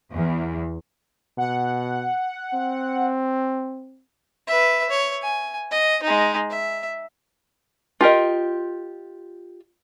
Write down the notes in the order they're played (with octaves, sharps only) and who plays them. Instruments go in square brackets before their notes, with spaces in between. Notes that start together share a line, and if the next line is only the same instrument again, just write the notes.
[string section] E2
[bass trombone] B2 [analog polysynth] F#5
[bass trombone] C4
[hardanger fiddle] B4 E5
C#5
G#5
D#5
G#3 D#4
E5
[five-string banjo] F4 G4 A#4 D#5